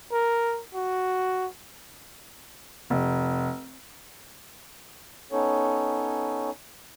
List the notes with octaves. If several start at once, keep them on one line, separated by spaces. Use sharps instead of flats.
A#4
F#4
F1
B3 C#4 D#4 A4 C#5